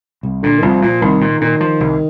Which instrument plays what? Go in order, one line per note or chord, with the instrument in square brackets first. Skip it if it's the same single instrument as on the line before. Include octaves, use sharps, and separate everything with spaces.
[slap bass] C2
[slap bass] A#2 [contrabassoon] D3
[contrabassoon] D#3
[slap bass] C2 [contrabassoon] F3
[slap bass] A#2 [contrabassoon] F3
[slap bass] C2 [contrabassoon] D#3
[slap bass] A#2
[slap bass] A#2 [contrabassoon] D#3
[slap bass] F3
C2